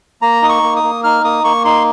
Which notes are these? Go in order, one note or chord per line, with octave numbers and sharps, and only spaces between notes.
A#3 A#5
D#4 D#6
C#6
A#3
D#6
A#3
D#4 F6
A#3 D#6
A#3 C#6
D#4 C6